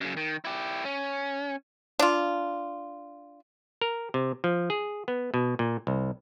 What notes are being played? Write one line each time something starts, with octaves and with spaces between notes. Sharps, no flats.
F#2 C#3
D#3
E4 G4
C#4
D4 F4
A#4
C3
F3
G#4
B3
B2
A#2
C2